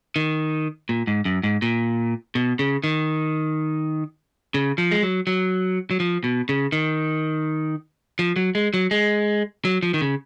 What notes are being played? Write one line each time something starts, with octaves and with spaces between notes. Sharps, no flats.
D#3
A#2
G#2
F#2
G#2
A#2
B2
C#3
D#3
C#3
F3
G#3
F#3
F#3
F#3
F3
B2
C#3
D#3
F3
F#3
G#3
F#3
G#3
F#3
F3
D#3
C#3